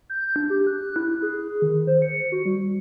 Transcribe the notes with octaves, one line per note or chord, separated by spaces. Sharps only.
G6
D4
G4
F#6
E4
G#4
D#3
C5
C#7
F#4
G3